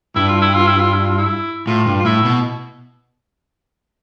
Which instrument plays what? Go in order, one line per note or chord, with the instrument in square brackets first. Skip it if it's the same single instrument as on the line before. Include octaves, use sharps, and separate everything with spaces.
[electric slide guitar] G2 [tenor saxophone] E4
[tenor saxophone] F4
E4
F4
E4
F4
E4
F4
E4
[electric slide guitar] A2 [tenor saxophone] F4
[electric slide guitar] G2
[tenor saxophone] F4
[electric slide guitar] A2 [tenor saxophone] E4
[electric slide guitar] B2